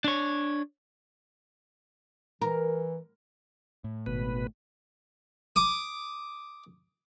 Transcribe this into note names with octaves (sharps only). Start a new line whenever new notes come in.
D4 C#5
E3 A#4
A2
G#1 B2 B4
D6 D#6